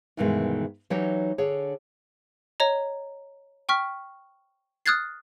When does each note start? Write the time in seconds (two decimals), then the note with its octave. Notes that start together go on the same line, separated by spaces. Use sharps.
0.17 D2 G2 B2 D#3 E3 G#3
0.90 E3 F#3 D#4 G4 C#5
1.38 D3 G#4 C#5
2.60 C#5 D#5 A#5
3.69 G5 C#6 F6 B6
4.86 D#6 F6 F#6 G#6 A6 C7